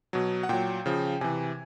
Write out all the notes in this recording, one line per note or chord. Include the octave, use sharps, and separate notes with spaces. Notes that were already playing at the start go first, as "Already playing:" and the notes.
B2 F#3
F#5
A#2 F#3 G5
C#3 F3
C3 E3 G#5